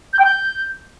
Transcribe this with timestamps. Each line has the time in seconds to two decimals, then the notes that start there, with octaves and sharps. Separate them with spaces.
0.13 G6
0.19 G5
0.25 G6